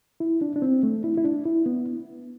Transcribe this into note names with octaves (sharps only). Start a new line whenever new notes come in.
E4
D4
D4
C4
A3
E4
E4
D4
E4
B3